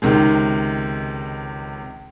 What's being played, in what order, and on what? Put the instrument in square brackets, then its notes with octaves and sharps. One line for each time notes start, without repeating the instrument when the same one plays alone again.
[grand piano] C#2 C3 D#3 G#3